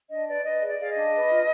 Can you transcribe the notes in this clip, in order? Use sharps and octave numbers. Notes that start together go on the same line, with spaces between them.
D4 D#5
B4 D5
B4 D#5
G#4
D5
G#4 F5
D#5
D4
B4
F4